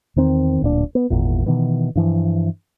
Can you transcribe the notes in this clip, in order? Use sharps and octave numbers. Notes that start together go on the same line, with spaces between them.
E2 D#3 C4
D1 A#2 D4
B3
G#1 E2 A#2
B2 D#3 E3
G2 E3 F3